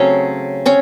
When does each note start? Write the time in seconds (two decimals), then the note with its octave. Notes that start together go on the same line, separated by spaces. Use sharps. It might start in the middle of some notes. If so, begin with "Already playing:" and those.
Already playing: C#3 F#3 A3 C4 C#4 C#5
0.66 C4 C#4 C#5